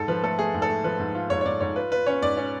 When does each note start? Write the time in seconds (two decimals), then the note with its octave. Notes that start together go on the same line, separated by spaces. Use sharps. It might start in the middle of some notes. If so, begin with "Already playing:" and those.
Already playing: G#2 A4
0.08 F3 B4
0.23 A3 A4
0.39 A3 G#4
0.54 G#2
0.62 A4
0.69 A3
0.84 F3 B4
1.00 G#2
1.15 F4
1.30 G#2 C#5
1.41 C#5
1.46 G#2 D5
1.60 G#2 C#5
1.76 F4 B4
1.91 F4 B4
2.06 C#4 C#5
2.22 G#2 D5
2.37 C#4